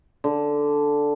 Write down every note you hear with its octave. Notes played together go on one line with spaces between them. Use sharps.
D3